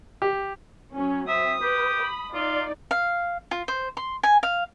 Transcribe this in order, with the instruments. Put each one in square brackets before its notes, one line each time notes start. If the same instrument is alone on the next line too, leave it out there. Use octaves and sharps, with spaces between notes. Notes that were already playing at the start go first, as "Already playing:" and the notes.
[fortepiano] G4
[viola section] F#3 C#4
[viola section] C4 [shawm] E5 [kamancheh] D#6
[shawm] G4 [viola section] B4
[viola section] B5
[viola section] D#4 D5 [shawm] F4
[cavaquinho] F5
F4
C5
C6
G#5
F5